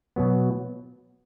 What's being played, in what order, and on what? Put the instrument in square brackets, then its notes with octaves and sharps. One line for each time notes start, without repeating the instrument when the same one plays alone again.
[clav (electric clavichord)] B2 F#3 B3